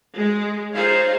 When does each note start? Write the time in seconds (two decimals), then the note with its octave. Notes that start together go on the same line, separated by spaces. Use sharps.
0.17 G#3
0.74 D#4 F4 G#4 C5 C#5 F5